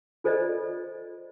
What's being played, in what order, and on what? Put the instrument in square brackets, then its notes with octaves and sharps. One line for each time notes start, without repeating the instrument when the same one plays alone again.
[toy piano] F4 A4 C5 D5 D#5